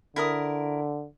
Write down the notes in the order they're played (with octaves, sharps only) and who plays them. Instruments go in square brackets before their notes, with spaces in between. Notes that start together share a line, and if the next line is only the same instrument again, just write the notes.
[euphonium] D3 [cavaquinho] E4 A#4 D#6